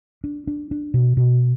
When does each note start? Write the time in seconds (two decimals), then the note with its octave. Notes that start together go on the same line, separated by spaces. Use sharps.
0.24 D4
0.47 D4
0.71 D4
0.94 B2
1.17 B2